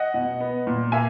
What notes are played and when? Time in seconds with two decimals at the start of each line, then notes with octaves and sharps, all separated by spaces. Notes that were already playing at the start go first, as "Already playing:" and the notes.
Already playing: D#5 F#5
0.14 B2
0.40 B3
0.67 A#2
0.92 A#3 E5 G#5